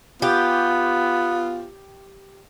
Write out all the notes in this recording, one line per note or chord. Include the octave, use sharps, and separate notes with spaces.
B3 F4 G4